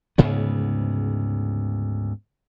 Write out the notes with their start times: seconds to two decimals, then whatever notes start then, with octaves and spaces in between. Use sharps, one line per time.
0.18 D2 G#2 C#3 B3